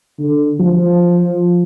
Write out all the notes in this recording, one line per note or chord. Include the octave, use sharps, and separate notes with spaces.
D3
F3